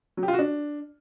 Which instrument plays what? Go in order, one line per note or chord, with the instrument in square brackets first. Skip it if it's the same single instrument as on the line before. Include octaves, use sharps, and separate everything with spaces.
[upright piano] F#3
G4
F4
F#4
D4